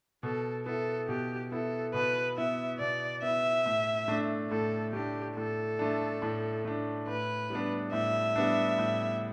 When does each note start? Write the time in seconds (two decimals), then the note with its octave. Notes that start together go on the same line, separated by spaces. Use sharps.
0.23 B2 A4
0.66 B3 E4 A4
1.08 B2 G4
1.52 B3 E4 A4
1.94 B2 B4
2.37 B3 E4 E5
2.79 B2 D5
3.22 B3 E4 E5
3.66 A2
4.08 A3 D4
4.50 A2 A4
4.93 A3 D4 G4
5.36 A2 A4
5.79 A3 D4
6.22 A2
6.65 A3 D4
7.07 A2 B4
7.50 G3 B3 D4
7.93 A2 E5
8.36 G3 B3 D4
8.78 A2